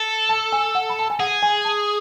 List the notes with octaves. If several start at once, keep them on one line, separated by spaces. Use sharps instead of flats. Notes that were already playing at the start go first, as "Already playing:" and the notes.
Already playing: A4
A5
G#5
F#5
B5
A5
G#5
G#4 F#5
G#5
A5